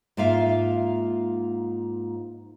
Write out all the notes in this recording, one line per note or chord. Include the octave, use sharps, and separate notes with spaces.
G#2 A#3 F4 E5 F5